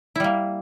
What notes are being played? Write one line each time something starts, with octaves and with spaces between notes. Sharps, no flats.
G3 A#3 E4